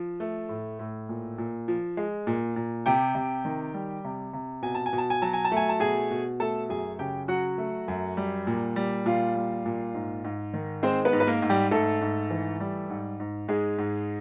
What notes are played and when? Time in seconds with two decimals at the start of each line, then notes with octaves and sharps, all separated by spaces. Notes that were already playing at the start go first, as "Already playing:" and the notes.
Already playing: F3
0.20 A3
0.49 A2
0.79 A2
1.09 A#2
1.38 A#2
1.68 F3
1.97 G#3
2.27 A#2
2.56 A#2
2.86 C3 G4 G5
3.15 C3
3.45 D#3
3.74 G3
4.05 C3
4.33 C3
4.62 B2 G#5
4.75 A5
4.86 G#5
4.93 B2
4.98 A5
5.10 G#5
5.22 F#3 A5
5.33 G#5
5.45 A5
5.52 A3 G#5
5.69 A5
5.80 B2 G#4 G#5
6.11 B2
6.40 A3 A4 A5
6.69 F#2 G#4 G#5
6.99 C#3 G4 G5
7.28 F#3 F#4 F#5
7.58 A3
7.88 F#2
8.17 G3
8.47 A#2
8.76 G3
9.06 A#2 F4 F5
9.35 G3
9.66 A#2
9.95 G#2
10.24 G#2
10.54 D#3
10.83 G#3 C4 C5
11.05 B3 B4
11.13 G#2
11.20 B4
11.27 A#3 A#4
11.42 G#2
11.50 G3 G4
11.71 G#2 A3 A4
12.01 G#2
12.31 E3
12.60 G3
12.90 G#2
13.20 G#2
13.48 G#2 G#3 G#4
13.78 G#2